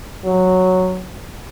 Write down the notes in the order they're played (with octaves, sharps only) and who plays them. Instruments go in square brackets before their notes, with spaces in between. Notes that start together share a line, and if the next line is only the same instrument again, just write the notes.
[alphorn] F#3